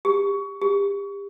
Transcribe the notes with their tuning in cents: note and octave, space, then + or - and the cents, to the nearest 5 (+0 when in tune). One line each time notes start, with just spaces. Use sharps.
G4 +30
G4 +35